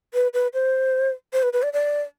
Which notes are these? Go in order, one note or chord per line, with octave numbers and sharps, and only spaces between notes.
B4
B4
C5
C5
B4
B4
D5
D5